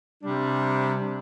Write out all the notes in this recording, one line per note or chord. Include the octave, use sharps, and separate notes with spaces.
C3 G3 D4